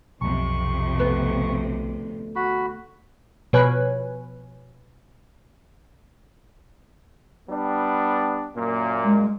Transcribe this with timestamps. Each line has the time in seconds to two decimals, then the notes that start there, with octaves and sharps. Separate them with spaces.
0.21 B1 F2 C3 C#6
0.99 D2 B3
2.36 F#4 B5
3.53 B2 F3 B4 C#5 G#5 F#6
7.49 G3 B3 D4
8.55 F#2 A#2 A#3
9.05 G#3